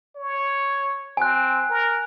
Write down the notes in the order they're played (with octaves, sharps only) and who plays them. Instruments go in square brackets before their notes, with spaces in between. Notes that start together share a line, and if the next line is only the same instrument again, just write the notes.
[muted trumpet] C#5
[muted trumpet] C4 [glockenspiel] G#5 F#6
[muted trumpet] A#4